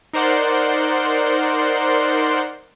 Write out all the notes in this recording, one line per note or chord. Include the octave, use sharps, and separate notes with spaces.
D#4 A#4 C5 D5 F#5 C6